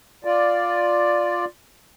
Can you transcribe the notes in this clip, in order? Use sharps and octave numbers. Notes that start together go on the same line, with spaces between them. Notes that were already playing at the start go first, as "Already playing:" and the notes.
F4 D5